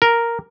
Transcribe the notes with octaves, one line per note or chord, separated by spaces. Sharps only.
A#4